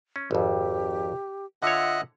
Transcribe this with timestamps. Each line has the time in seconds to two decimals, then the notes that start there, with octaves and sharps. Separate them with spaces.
0.16 C#4
0.31 G#1 F2 G4
1.62 D3 F4 C#5 D#5 E5 F#5